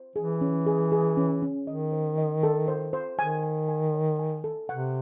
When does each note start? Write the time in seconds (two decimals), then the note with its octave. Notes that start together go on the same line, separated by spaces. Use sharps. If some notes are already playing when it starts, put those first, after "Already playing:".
Already playing: C5
0.16 E3 G#4
0.41 C#4
0.67 G#4
0.92 G#4
1.17 C#4
1.42 C#4
1.67 D#3 D#5
1.92 C5
2.18 D#5
2.43 A4
2.68 C5
2.93 C5
3.19 D#3 G#5
3.44 G#5
3.68 G#5
3.94 C#5
4.19 G#5
4.44 A4
4.69 C3 F#5